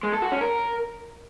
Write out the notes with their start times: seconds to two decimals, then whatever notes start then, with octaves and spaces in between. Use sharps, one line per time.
0.03 G#3
0.13 A4
0.22 F#4
0.32 C#4
0.41 A#4